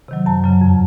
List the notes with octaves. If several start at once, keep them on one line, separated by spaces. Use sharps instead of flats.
C3 D#3 F#3
F#2 A5
C#3 F#3
F2